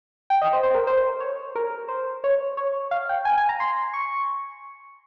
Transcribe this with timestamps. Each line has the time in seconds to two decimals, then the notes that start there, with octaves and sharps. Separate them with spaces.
0.30 G5
0.42 D#5
0.53 C5
0.63 C5
0.75 A#4
0.87 C5
1.20 C#5
1.55 A#4
1.88 C5
2.24 C#5
2.57 C#5
2.91 F5
3.09 G5
3.25 G#5
3.38 G#5
3.49 A#5
3.60 C6
3.93 C#6